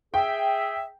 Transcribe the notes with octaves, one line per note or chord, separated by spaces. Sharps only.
G#4 E5 G5